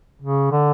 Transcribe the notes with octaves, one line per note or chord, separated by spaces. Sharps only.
C#3
D3